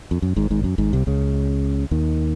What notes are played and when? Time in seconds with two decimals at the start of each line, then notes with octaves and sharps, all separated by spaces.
0.11 F2
0.22 F#2
0.36 G#1 G#2
0.50 G#1 G#2
0.64 F#2
0.78 G#1 G#2
0.93 C2 C3
1.07 C#2 C#3
1.91 D#2 D#3